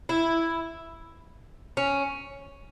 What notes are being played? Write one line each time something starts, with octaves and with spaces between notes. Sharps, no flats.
E4
C#4